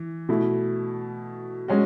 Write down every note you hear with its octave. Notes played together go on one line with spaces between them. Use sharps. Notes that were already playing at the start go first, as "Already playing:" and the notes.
Already playing: E3
B2 A3 E4
G#3 C#4 F#4